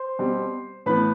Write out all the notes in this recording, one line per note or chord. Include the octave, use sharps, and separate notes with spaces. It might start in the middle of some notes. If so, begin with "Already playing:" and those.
Already playing: C5 C6
B2 G3 C4
A2 E3 B3 B4 B5